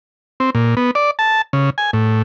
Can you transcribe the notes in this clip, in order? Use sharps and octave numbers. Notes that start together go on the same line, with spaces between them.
C4
A#2
B3
D5
A5
C#3
G#5
A2